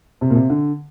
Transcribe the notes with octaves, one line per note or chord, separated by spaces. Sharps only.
C3
A#2
C3
D3